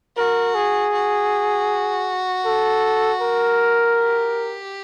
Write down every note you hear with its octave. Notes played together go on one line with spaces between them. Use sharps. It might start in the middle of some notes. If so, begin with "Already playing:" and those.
F#4 A#4
G#4
F#4
A4
A#4
G4